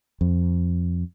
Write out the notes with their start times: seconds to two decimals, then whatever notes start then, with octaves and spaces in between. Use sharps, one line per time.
0.21 F2